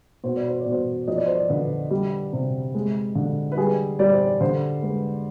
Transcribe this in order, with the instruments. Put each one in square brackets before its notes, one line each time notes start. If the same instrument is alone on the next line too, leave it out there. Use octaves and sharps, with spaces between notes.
[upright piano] B2 C5
D5
C5
D5
B2
C5
F3 D#5
D5
C5
D5
D3 B4
G3
C3
G#3
D3
B4
G3 G#4
G3 D5
C5
D5
D3 C5
G#3 B4